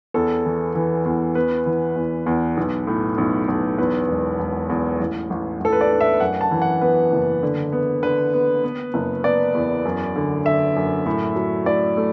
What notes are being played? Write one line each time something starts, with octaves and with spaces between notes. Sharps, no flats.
E2 A4
E3
E3
E2
B3 B4
E3
E2
E2
B1
A2
B1
B1
E2 B4
E1
E1
E2
A1
A1
A1 A4
B4
D5
D4
E5
F#2 F#5
A5
E3
F#5
B3 B4
F#1
D3
B3
D3 B4
B3
B3
F#1
B3 D5
E2
F#2
D3
D3 E5
F#2
A2
F#3
A2 D5
A3